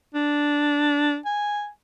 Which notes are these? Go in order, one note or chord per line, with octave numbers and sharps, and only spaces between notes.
D4
G#5